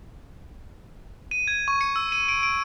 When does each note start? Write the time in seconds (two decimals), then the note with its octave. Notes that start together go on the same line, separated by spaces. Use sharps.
1.31 D#7
1.48 G#6
1.68 C#6
1.81 C#7
1.96 E6
2.12 D#7
2.28 D7
2.43 D7